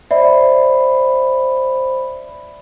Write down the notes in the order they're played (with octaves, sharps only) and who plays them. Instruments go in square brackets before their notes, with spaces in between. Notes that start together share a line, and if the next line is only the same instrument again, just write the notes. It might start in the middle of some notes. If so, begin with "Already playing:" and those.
[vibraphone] C5 B5 [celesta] D5 E5